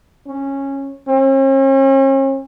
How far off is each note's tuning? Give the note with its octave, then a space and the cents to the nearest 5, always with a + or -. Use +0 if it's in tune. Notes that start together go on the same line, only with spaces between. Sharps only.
C#4 -15
C#4 -45